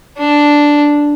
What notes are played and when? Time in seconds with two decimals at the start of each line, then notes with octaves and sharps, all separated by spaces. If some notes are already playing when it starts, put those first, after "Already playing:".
0.18 D4